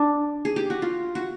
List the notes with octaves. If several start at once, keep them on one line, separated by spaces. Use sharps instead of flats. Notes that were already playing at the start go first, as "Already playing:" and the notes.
Already playing: D4
G#4
G4
F#4
F4
F#4